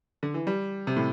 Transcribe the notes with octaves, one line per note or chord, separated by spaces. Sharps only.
D3
E3
G3
C3
A2